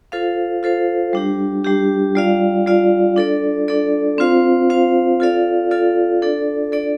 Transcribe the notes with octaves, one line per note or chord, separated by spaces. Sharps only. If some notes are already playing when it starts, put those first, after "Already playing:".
F4 A4 C5 F5
F4 A4 C5 F5
G3 D4 G4
G3 D4 G4
G3 F4 D5 F5
G3 F4 D5 F5
D4 A4 D5
D4 A4 D5
C4 F4 C5 F5
C4 F4 C5 F5
F4 A4 D5 F5
F4 A4 D5 F5
D4 A4 D5
D4 A4 D5